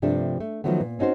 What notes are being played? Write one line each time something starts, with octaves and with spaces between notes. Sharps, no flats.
G2 C3 F3 A3 D4 A4
A3
D#3 F3 F#3 A3 B3
A#2
C4 C#4 D#4 F#4 C5